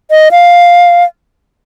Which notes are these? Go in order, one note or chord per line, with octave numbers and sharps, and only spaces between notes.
D#5
F5